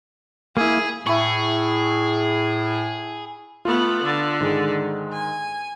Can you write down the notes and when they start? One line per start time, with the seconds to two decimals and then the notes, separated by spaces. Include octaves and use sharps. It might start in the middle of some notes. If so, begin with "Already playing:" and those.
0.57 A#3 E4 G#4
1.06 A2 E4 G#4 C#6
3.65 A3 B3 F4
4.02 D3
4.41 G#2 D#3 G#3
5.13 G#5